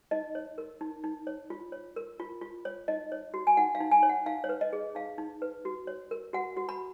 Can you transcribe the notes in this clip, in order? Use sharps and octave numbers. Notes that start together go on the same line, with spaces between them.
D#4 D#5
C#5
A#4
D#4
D#4
C#5
F4
C#5
A#4
F4
F4
C#5
D#4 D#5
C#5
F#4
G#5
D#4 F#5
F5
D#4
G#5
C#5
F#5
D#4 F5
C#5
B4
D#5
G#4
D#4 F5
D#4
B4
F#4
C#5
A#4
F#4 F#5
F#4
B5